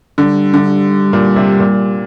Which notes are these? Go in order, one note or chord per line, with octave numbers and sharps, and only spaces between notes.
D3 G3
D3
A#2
C3
A#2